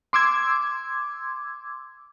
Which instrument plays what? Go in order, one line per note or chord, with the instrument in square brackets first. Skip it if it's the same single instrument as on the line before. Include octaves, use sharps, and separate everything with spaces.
[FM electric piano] C6 D6 E6 G#6